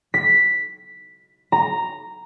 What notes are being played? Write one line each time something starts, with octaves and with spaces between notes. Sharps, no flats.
B6
A#5